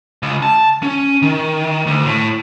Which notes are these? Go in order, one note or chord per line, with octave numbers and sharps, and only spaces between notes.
C#2
A5
C#4
D#3
D2
A2